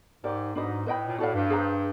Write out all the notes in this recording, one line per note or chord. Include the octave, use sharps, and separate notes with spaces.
G#2 D#4 G4 A#4 D5
G#2 D4 F#4 B4 D#5
A2 B4 D#5 G5 B5
A#2
A2 F#4 A4 D5 F5
G2
G#4 C5 F5 A#5